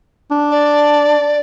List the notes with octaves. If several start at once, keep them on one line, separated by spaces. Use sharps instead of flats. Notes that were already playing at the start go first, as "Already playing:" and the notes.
D4
D5